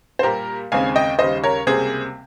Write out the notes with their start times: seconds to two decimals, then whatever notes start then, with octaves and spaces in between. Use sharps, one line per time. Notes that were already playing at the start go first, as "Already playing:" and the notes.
0.19 C5
0.23 A#2 G3 A#3 G4 A#4
0.72 D#2 C#3 G#3 C4 F5 G#5
0.96 D#5 G5
1.19 D#2 C#3 G3 C5 D#5
1.44 A#4 C#5
1.67 C#2 C3 G3 A#3 G#4 C5